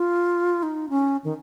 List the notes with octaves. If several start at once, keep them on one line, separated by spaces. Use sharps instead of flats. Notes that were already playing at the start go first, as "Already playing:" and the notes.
Already playing: F4
D#4
C#4
D#3